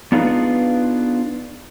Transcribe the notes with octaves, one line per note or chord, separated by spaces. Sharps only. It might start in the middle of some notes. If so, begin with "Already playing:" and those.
B3 D4 D#4 F4 G#4 B4